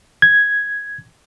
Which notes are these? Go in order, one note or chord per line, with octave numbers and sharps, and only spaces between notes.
G#6